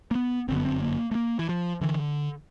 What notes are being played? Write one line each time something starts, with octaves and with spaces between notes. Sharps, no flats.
A#3
B3
G1 F#2 D3 C4
B3
C4
A#3
A3
A#3
E3
F3
D3 E3